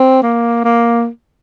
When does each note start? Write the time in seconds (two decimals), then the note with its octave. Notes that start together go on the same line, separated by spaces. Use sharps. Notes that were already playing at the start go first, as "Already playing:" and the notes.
Already playing: C4
0.23 A#3
0.64 A#3